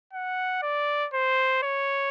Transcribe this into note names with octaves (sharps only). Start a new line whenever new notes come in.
F#5
D5
C5
C#5